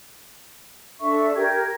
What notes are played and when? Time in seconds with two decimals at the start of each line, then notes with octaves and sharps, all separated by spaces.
1.00 D4 A4 E5 C#6
1.35 G4 A#4 G#6